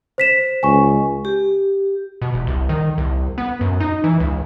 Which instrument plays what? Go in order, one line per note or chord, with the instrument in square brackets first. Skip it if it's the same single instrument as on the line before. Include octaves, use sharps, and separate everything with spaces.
[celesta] C5 B6 E7
[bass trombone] C#2 [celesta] G#5 C#6
[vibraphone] G4
[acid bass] B2
E1
C2
D#3
C2
B3
F#2
D#4
E3
C#2